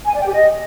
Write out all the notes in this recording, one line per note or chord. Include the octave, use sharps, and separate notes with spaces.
G#5
D5
G5
G4
D#5